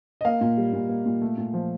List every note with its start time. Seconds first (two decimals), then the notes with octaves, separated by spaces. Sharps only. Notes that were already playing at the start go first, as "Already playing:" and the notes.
0.21 D#5
0.25 A#3 F5
0.41 A#2
0.57 G3
0.73 A#2
0.89 A#3
1.06 A#2
1.21 A3
1.38 A#2
1.54 F3